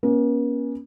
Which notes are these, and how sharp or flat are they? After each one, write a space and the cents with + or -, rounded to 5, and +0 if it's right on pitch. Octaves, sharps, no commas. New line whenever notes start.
A#3 +45 C#4 +0